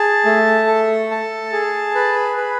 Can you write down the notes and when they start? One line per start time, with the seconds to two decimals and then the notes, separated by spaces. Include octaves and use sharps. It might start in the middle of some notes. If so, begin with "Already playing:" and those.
Already playing: G#4 A5
0.25 A3
0.67 A4
1.11 A5
1.52 G#4
1.95 B4
2.37 B4